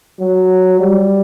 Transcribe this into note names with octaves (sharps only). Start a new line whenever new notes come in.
F#3
G3